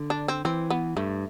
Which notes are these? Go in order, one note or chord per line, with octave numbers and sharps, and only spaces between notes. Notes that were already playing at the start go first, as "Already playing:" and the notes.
Already playing: D3
D4
C4
E3 C4
B3
G2 A3